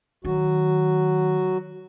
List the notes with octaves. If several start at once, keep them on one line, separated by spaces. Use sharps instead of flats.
D#3 F#3 F#4